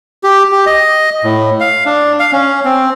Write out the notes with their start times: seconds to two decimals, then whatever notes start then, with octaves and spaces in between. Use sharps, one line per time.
0.24 G4
0.52 G4
0.66 D#5
1.24 A2
1.60 F5
1.86 D4
2.20 F5
2.33 C#4
2.65 C4